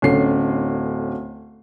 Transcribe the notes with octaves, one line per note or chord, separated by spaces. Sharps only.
D1 D3 C#4 C7